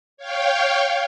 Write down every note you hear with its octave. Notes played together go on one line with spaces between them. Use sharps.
C#5 F5 G5